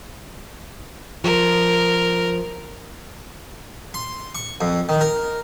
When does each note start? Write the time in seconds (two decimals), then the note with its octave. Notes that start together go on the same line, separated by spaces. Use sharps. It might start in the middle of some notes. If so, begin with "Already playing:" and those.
1.24 F3 A#4
3.94 C6
4.35 C#6
4.61 F2
4.89 D#3
5.01 A#4